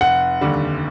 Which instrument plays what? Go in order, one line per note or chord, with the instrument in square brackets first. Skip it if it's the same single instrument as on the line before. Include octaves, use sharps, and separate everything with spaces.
[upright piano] F1 [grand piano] F#5
[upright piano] D#2 D3 G3